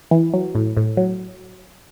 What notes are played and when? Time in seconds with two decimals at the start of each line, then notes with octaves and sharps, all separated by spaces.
0.11 E3
0.34 F#3
0.55 A2
0.77 A2
0.97 F#3